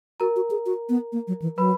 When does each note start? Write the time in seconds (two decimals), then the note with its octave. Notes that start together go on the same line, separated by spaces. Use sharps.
0.20 F#4 A#4 A#5
0.36 F#4
0.51 G#4
0.66 F#4
0.89 B3
1.12 A#3
1.28 F#3
1.42 E3
1.57 F#3 B4 B5